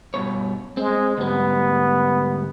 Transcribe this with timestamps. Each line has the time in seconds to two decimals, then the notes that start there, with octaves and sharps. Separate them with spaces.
0.14 G2 B2 C#5
0.77 G#3 C4
1.18 D2 G#2 G3 B3